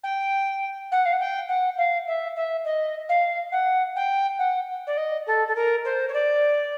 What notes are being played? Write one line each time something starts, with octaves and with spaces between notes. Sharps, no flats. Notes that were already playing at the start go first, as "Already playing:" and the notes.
G5
F#5
F5
F#5
G5
F#5
F5
E5
E5
D#5
F5
F#5
G5
F#5
D5
D#5
A4
A4
A#4
C5
C#5
D5